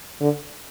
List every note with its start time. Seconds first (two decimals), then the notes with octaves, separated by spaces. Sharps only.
0.21 D3